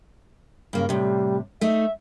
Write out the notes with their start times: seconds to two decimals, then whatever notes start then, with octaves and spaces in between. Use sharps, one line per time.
0.73 G2 C#3 A#3
0.89 A2 C3 G3
1.61 A3 D#4 E5